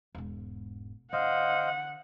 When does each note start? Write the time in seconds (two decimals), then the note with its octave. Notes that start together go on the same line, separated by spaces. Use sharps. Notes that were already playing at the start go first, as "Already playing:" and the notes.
0.15 E1 G#2
1.13 D3 C5 D#5 F5 F#5